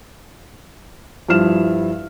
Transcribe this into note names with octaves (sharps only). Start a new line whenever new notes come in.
G2 F3 E4 F6 E7